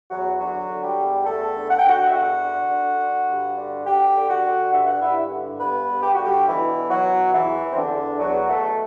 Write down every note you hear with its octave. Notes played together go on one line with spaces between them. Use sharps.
E2 F#3 F#4
D3 F#3 F#4
D3
G3 G4
E2
E2 A3 A4
D3
F#5
G5
D3 F#4 F#5
E5
E2 F#4 F#5
D3
D3
D3
G2
D3
D3 G4 G5
D3
F#4 F#5
D3
G2 E5
F#5
G2 E4 E5
D3
G2 B3 B4
G2
G4
D3 F#4
G3 G4
B2 E3 E4
B2
F#3 F#4
B2
E2 E3 E4
E2
C4
D3 D4
E2
E2 F#3 F#4
B2 A3 A4